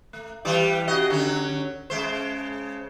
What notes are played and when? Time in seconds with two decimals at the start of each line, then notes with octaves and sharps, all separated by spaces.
0.13 A3
0.45 E3 G3 D5
0.88 C#3 F#4 D#5
1.10 D3 F#3 C#4
1.90 C#3 G#3 C5